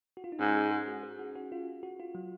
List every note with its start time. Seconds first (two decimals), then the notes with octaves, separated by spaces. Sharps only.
0.17 F#4
0.24 F4
0.32 D#4
0.39 G#2 C#4
0.56 G#4
0.71 G#4
0.88 F#4
1.03 G#4
1.19 F#4
1.35 F#4
1.52 F4
1.83 F#4
2.00 F4
2.15 F#3